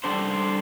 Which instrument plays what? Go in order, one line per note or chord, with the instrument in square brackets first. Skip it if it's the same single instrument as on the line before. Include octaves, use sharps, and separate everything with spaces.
[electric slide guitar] G3 D4 A4 C5